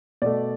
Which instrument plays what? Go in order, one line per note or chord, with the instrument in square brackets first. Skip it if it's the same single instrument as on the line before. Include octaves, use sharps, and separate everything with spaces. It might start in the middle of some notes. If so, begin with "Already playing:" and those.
[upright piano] B2 A3 D5